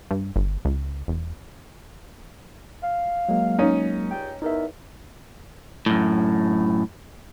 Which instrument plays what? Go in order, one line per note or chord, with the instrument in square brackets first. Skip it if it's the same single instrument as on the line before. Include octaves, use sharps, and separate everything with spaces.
[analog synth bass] G2
G1
C#2
E1
[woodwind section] F5
[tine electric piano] F#3 G#3 A#3
[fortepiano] C#4 D#4
[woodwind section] C#2 G3 G5
[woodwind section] E2 [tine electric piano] D#4 A#4 E5
[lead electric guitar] F#2 A2